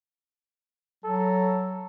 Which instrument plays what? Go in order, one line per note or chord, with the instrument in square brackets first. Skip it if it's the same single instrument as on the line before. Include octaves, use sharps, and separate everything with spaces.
[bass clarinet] F#3 [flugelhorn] A4